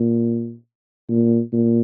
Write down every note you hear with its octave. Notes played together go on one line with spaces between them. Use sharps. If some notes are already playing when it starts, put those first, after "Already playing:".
Already playing: A#2
A#2
A#2